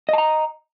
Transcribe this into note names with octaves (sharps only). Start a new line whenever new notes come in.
D#5 A5 A#5